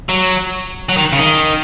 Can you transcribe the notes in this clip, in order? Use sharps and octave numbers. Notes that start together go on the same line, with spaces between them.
F#3
F#3
D#3
C#3
D#3